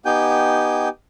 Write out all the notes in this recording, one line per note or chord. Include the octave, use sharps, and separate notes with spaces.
B3 D#4 G4 G5 G#5 G6